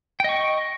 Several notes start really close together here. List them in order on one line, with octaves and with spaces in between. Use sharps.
G5 D#5 C#6